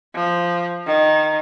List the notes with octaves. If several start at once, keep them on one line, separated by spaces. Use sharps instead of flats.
F3
D#3